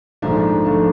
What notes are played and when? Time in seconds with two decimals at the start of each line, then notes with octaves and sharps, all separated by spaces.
0.22 A#1 G#2 F3 A3 D4
0.65 F3 A3 D4